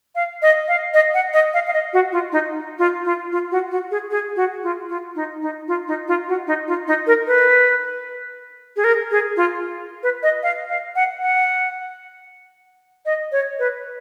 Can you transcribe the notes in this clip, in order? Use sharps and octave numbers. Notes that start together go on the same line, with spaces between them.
F5
D#5
F5
D#5
F#5
D#5
F5
F5
D#5
F#4
F4
D#4
F4
F4
F4
F#4
F#4
G#4
G#4
F#4
F4
F4
D#4
D#4
F4
D#4
F4
F#4
D#4
F4
D#4
A#4
B4
G#4
A#4
G#4
F4
B4
D#5
F5
F5
F#5
F#5
D#5
C#5
B4